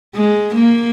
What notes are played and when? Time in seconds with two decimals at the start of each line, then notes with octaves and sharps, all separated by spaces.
0.15 G#3
0.55 A#3